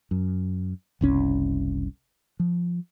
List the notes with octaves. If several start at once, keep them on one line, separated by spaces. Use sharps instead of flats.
F#2
F#1 C2 C#4
F3